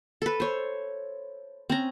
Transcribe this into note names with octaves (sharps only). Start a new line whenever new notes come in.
A4 B4
C5 C#5
C4 C#4 A#5